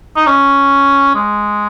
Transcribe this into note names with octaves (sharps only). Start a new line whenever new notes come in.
D#4
C#4
G#3